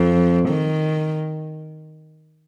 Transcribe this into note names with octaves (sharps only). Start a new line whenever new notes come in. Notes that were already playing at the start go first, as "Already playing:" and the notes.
Already playing: F2
D#3